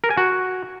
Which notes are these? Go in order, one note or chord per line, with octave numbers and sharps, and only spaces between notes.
A#4
G#5
F#4